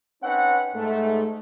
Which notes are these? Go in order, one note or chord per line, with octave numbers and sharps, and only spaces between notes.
C4 C#4 D#4 B4 F#5
G#2 A3